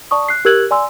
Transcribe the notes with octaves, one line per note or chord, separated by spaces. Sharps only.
D5 A5 C#6 D#6
F#6 C7
G4 A#4 E6 F#6 G#6 F#7
D5 G#5 C6 E6